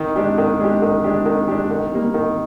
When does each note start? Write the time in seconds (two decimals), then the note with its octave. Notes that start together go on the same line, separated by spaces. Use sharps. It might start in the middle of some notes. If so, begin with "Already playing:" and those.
Already playing: D#3
0.16 G#3 D4 G4
0.38 D#3
0.60 G#3 D4 G4
0.82 D#3
1.04 G#3 D4 G4
1.26 D#3
1.48 G#3 D4 G4
1.70 D#3
1.92 G3 A#3
2.14 D#3